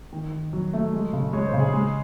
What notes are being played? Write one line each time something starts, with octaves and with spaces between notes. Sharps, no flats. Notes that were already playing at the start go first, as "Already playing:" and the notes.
D#3
D#3
F#3
A3
G#3
C#3
G#3 C#5
C5
C#3
G#4
G#3